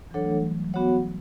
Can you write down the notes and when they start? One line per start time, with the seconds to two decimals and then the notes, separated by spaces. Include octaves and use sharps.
0.11 E3
0.14 F#3 D4 A4 C#5 F#5
0.24 A3
0.29 E3 G3
0.44 F#3
0.54 F#3
0.65 F#3
0.74 B3 F#4 C#5 F#5